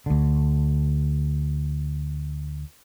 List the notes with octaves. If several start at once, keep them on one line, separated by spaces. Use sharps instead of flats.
D2 D3